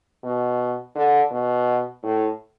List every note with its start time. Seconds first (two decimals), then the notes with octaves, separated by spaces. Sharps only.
0.24 B2
0.95 D3
1.31 B2
2.03 A2